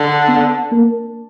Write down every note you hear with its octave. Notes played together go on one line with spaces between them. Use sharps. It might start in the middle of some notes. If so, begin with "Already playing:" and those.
Already playing: D3
B3
A#3